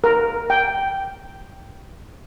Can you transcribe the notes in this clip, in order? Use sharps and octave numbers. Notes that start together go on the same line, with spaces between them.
A#4
G5